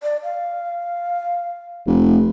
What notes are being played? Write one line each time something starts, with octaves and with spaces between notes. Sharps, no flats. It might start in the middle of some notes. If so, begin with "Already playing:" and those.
D5
F5
F1